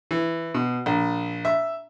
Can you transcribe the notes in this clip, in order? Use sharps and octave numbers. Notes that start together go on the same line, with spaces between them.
E3
B2
A#1
E5